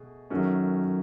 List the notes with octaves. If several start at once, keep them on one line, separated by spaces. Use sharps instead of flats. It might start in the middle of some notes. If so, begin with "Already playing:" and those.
Already playing: B2 A3 G#4
F#2 D#3 A3 C#4 F#4